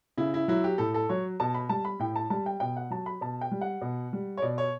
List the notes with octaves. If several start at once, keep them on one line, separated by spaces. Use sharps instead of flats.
C#3 E4
E4
F#3 E4
G4
A2 A4
A4
F#3 C#5
B2 A5
B5
G3 A5
B5
A2 G5
A5
G3 A5
G5
B2 G5
F#5
F#3 A5
B5
B2 A5
G5
G3
F#5
B2
G3
C#5
B2 D5
C#5